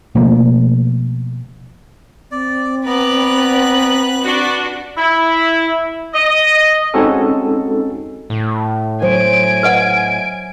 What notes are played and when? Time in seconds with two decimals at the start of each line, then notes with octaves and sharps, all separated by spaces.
0.15 B2 F3 A3 A#3
2.31 C4 D5
2.86 B3 B4 D5 A#5 F#6
4.22 D4 F#4
4.97 E4
6.14 D#5
6.94 G#3 C4 C#4 D#4 F#4 A4
8.30 A2
9.02 F#3 C5 C#5 G#5 D7
9.63 B4 D#5 F#5